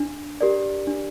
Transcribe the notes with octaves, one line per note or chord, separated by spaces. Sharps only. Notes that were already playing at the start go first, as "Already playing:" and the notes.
Already playing: D4
G4 A#4 D5
D4